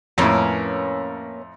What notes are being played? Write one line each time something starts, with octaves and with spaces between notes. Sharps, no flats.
F2 A2 A#3 C#4 B4